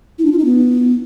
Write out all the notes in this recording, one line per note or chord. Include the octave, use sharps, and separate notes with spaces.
E4
D4
F4
D#4
B3